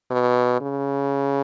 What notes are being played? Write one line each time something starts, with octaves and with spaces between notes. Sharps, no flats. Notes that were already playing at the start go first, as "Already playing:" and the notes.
B2
C#3